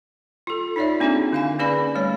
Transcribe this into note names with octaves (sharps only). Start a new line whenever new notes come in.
F4 A4
D#4 F4 C#5 D5 E5
A#3 C4 D4 D#4 F#4 G#4
D3 F5 G#5
A#3 C#4 G#4 B4 D5 B5
G3 A3 C#5